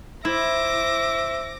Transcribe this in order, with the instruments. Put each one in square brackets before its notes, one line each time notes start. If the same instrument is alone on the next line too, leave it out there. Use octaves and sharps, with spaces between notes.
[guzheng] E4 [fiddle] C5 [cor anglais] E5 [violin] D6 A#6